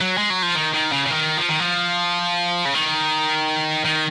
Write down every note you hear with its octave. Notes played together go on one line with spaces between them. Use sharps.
F#3
G#3
F#3
F3
D#3
D#3
C#3
C#3
D#3
F3
D#3
F3
C#3
D#3
D#3